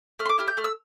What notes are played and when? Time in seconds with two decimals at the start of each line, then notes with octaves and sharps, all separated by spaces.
0.19 A3 F6
0.25 C6
0.29 D6
0.38 E4 G4 F6
0.48 G6
0.57 A3 F6
0.64 E6